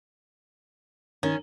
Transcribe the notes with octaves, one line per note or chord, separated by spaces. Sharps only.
D#3 C#4